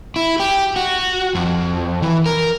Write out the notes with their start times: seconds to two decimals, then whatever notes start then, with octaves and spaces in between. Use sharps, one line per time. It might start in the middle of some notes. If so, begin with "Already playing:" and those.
0.16 E4
0.40 G4
0.76 F#4
1.35 F2
2.02 E3
2.26 A#4